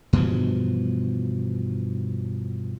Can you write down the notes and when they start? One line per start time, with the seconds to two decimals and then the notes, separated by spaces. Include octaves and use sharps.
0.13 G2 B2 E3 F3